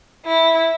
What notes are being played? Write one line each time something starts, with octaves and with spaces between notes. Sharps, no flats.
E4